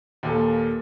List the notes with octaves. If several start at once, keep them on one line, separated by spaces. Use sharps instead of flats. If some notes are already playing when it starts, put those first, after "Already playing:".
D#2 A#2 A4